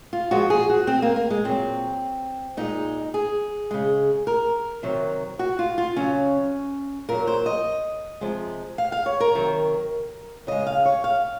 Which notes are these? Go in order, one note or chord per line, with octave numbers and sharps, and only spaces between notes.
F4
A#2 F3 G#3 F#4
G#4
F#4
C4
A#3
A#3
G#3
A#2 F#3 C4
A#2 G#3 D#4
G#4
C#3 G#3
A#4
C3 D#3 F#3
F#4
F4
F4
C#3 F#3 C#4
A#2 F#3 A#4
C5
D#5
C3 F3 G#3
F5
F5
C#5
A#4
C3 D#3 F#3
C#3 G#3 D#5
F5
C#5
F5